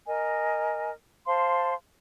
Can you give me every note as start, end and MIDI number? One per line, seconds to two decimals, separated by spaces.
0.07 0.91 70
0.07 0.91 75
0.07 0.91 80
1.27 1.73 72
1.27 1.73 77
1.27 1.73 81
1.27 1.73 84